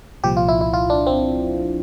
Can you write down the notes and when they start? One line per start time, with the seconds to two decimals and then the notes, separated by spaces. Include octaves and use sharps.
0.24 C2 A#2 F3 G4
0.37 F4
0.48 E4
0.61 E4
0.74 F4
0.90 D4
1.07 C4